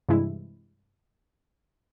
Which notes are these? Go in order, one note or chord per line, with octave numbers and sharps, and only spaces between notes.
G2 C3 E3 G#3 E4